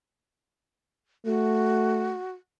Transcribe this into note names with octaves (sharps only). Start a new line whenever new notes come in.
A3 F#4